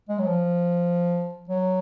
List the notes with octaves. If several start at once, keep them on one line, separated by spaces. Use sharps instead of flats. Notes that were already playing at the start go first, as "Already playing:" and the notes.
G#3
F#3
F3
F#3